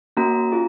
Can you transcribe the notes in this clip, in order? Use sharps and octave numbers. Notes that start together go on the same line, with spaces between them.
A#3 C#4 F#4 A#5
F4 G#4